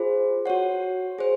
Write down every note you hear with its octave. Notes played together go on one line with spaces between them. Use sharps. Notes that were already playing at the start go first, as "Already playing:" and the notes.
Already playing: F4 G#4 C5
F#4 C#5 F#5
G#4 C5